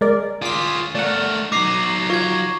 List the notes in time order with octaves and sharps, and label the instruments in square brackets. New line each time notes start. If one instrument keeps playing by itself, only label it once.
[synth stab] G#3 A#4 D5
[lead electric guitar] F4 G#4 [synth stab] D6 B6
[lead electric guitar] A3 A#4 [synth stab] D5 F#5
[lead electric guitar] F#3 D#4 [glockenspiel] D6 C7
[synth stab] F4 [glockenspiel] C#6 G#6